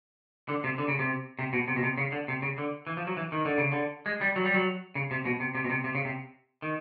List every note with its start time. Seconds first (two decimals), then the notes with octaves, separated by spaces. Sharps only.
0.49 D3
0.64 C3
0.78 D3
0.88 C#3
0.99 C3
1.39 C3
1.53 B2
1.68 C3
1.76 B2
1.83 C3
1.98 C#3
2.12 D3
2.28 C3
2.42 C#3
2.58 D3
2.87 E3
2.97 F3
3.07 F#3
3.17 E3
3.32 D#3
3.45 D3
3.58 C#3
3.72 D3
4.06 G#3
4.21 G3
4.36 F#3
4.45 G3
4.54 F#3
4.95 C#3
5.11 C3
5.25 B2
5.40 C3
5.55 C3
5.64 B2
5.70 C3
5.84 C3
5.95 C#3
6.05 C3
6.62 D#3